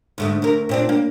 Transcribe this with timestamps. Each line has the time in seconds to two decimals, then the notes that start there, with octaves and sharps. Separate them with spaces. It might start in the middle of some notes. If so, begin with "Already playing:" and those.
0.18 D2 G#2 A3
0.42 D2 A#4
0.69 A#2 C4 D4
0.89 A#3